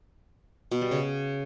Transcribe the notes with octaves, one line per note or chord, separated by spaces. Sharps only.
B2
G3
C#3